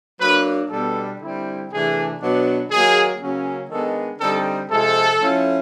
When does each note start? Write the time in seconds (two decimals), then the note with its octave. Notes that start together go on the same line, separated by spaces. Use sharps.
0.20 F#3 A#3 D4 B4
0.70 B2 G3 B3 D4 A4
1.20 D3 G3 C4 E4
1.70 C3 E3 A3 D4 G#4
2.20 B2 F#3 B3 D4
2.70 D#3 F#3 A#3 G#4
3.20 C#3 F#3 A#3 C#4
3.70 D#3 G#3 B3 D4 A4
4.19 D3 G3 C4 D#4 A4
4.69 C3 F3 G#3 A4
5.20 F3 A3 C#4 E4